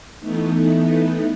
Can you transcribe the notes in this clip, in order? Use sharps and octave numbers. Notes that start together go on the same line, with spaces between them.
E3 A3 B3 D#4